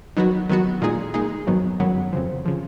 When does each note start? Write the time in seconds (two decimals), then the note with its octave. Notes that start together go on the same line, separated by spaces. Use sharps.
0.17 D#3 F#3 B3 F#4
0.49 D#3 F#3 B3 F#4
0.82 A#2 G#3 D#4 G#4
1.14 A#2 G#3 D#4 G#4
1.47 G#1 F#2 D#3 F#3 B3
1.79 G#1 F#2 D#3 F#3 B3
2.13 F2 C#3 F3
2.45 C#3 F3